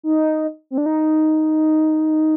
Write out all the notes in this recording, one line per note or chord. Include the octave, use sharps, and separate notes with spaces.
D#4
C4
D4
D#4